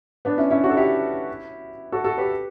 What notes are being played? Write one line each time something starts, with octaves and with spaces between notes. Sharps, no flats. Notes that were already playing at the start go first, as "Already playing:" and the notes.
B3 D4
C#4 E4
C#4 E4
D4 F#4
A4
E4 G4
F#4 A4
F#4 A4
G4 B4